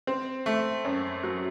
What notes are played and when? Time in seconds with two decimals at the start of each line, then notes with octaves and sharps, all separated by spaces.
0.07 C4
0.46 A3
0.85 F#2
1.23 F#3